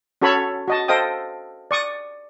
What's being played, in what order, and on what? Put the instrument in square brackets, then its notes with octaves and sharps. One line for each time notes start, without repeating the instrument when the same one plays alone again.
[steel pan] C#4 F#4 A4 C#5 B5 C#6
F#4 D#5 A5
A4 C5 D#5 F5 G5 D#6
D5 C#6 D#6